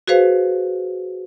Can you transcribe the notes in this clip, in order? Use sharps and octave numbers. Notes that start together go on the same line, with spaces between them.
F#4 G#4 B4 C5 F5